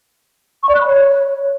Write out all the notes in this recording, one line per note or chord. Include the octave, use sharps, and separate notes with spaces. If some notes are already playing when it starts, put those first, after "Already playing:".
C#6
D5
F#6
B5
C#5